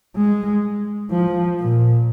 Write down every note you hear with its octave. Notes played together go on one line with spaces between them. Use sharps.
G#3
F3
A#2